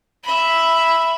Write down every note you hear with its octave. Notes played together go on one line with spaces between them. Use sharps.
E5 B5